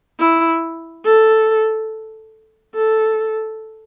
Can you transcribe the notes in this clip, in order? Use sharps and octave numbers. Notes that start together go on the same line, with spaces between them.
E4
A4
A4